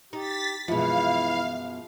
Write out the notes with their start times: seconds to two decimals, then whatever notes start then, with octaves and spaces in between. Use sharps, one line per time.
0.13 D#4 G4 A6 B6
0.68 F#2 B2 E3 F3 G#3 E4 F5